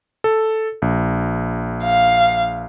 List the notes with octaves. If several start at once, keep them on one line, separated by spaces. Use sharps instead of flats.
A4
A#1
F5